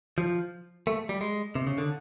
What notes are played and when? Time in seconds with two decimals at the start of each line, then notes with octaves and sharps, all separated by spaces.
0.18 F3
0.87 A3
1.09 G3
1.21 G#3
1.55 C3
1.67 C#3
1.78 D3